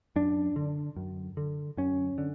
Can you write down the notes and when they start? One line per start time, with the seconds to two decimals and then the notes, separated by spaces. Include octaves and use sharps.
0.16 F#2 D4
0.56 D3
0.96 F#2
1.37 D3
1.77 F#2 C#4
2.18 D3